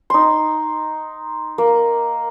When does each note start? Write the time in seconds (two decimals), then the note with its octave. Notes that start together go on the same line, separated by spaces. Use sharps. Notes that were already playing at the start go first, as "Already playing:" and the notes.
0.10 D#4 C6
1.58 A#3